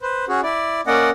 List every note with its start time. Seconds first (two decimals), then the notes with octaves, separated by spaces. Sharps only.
0.02 B4 C5
0.28 C#4 F#4 G#4
0.43 E4 D5
0.87 A#3 C#4 D5 D#5 F#5